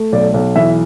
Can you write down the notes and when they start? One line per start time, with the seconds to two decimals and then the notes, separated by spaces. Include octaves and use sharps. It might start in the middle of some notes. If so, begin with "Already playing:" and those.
Already playing: A3
0.12 B1 D5
0.34 B1
0.56 E3 E5